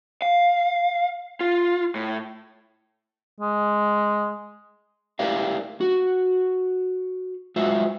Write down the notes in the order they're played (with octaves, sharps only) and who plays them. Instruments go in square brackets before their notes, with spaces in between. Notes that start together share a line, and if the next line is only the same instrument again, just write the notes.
[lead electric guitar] F5
F4
A2
[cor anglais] G#3
[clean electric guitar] E4 G4 A#4 D5 F5
F#4
G#3 F4 F#4 C5 E5